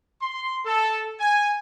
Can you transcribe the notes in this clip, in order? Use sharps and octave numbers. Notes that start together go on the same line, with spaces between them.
C6
A4
G#5